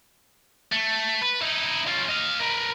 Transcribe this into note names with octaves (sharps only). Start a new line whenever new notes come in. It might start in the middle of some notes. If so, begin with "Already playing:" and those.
A3
B4
D#4 E4
C#4 F4
D#5 F5
A#4 B4